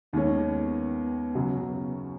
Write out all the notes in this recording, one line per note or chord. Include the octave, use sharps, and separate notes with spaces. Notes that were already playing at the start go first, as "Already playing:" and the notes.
D#2 D#3 G#3 B3 C#4
F#2 C#3 F#3